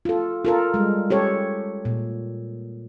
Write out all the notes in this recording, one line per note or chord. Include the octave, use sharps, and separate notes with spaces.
F4 A4
F4 A4 A#4
G3 G#3
G4 A4 C#5
A#2